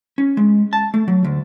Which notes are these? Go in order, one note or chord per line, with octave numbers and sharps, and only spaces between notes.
C#4
G#3
A5
A3
F#3
D2